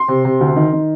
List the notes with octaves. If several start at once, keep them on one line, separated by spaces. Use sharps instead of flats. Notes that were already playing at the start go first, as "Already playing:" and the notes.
Already playing: C6
C3
C3
D2
D#3
D#3